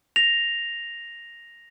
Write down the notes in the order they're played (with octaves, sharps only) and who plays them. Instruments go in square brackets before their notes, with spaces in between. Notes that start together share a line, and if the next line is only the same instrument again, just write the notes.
[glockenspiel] A#6 F7